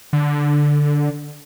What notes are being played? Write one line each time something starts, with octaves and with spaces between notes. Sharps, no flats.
D3